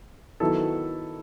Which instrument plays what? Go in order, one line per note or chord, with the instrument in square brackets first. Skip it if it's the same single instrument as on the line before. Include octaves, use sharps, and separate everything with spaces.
[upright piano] D#3 F#3 B3 E4 A4